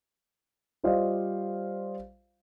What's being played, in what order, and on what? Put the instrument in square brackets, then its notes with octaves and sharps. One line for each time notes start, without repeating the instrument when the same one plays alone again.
[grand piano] G3 F4 C5 D5 D#5 F5